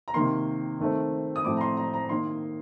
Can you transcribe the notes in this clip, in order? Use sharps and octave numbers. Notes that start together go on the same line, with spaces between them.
A#5
C3 D#3 A#3 C6
D#3 A3 C4
D#6
A2 F3 A3 C4 D6
A#5
C6
A#5
A#5
D#3 A#3 C6